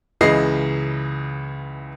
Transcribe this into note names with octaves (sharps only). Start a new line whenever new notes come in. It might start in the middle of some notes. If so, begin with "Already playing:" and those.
C#2 C#3 E3 D#5 C7